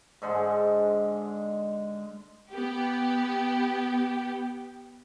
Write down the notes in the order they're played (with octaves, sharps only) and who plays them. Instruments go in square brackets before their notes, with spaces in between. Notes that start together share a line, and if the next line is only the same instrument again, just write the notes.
[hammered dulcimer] G#2 D3 G#3
[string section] B3 G4